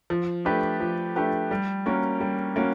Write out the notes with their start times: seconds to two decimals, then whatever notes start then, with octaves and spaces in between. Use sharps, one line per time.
0.10 F3
0.45 A3 D4 G4 B4
0.80 F3
1.16 A3 D4 G4 B4
1.51 G3
1.86 A#3 C#4 F#4 A#4
2.21 G3
2.56 A#3 C#4 F#4